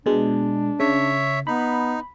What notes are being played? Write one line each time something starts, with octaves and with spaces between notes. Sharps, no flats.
B2 G#3 D4
C#3 C#5 E5
B3 D#4 B5